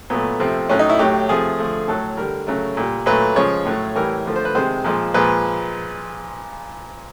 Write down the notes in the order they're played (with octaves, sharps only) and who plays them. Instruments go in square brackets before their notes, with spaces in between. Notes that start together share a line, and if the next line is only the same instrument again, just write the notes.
[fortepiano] A#2 F#3 A3 B3
C3 F3 A3 C4
A2 F#3 A3 C#4
D#4
E4
A2 F#3 A3 G4
C3 F3 A3 G#4
D3 F3 A3
A2 F#3 A3 A4
D3 G3 A#4
C#3 F#3 A3
A#2 G3
A#2 F#3 A3 B4
C#3 F3 G#3 C#5
A2 F#3 A3
A2 E3 G3 A#4
D3 F3 A3
C5
B4
C3 D#3 G#3 C5
A#2 F3 G#3
A#2 F3 G#3 B4